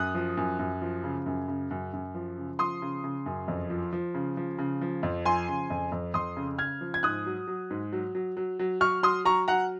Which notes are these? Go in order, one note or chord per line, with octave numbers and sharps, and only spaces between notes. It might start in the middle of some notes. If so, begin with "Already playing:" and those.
Already playing: F#2 D#6 F#6
F3
F#2
F#2
F3
C#3
F#2
C#3
F#2
F#2
F3
C#3
F3 C6 D#6
C#3
C#3
F#2
F2
F3
F3
C#3
F3
C#3
F3
F2
F3 G#5 C6
C#3
F2
F2
F2 C6 D#6
C#3
C#3 F6 G#6
F3
G#6
G#2 D#6 F#6
F#3
F#3
G#2
F#3
F#3
F#3
F#3
F#3 C#6 F6
F#3 C6 D#6
F#3 A#5 C#6
F#3 F#5 A#5